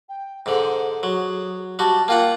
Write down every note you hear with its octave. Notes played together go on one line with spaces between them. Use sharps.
G5
G#2 D3 C5
F#3 G#4
G3 F#4 A5
A#3 F4 F#5 G5